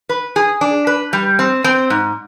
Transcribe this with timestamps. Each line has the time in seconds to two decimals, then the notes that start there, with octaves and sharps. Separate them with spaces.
0.09 B4
0.36 G#4
0.61 D4
0.87 B4
1.13 G3
1.39 C4
1.64 C4
1.90 G#2